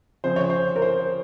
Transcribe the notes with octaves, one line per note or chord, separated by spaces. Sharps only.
C#3 F3 C4 C5
C#5
C5
A#4
C5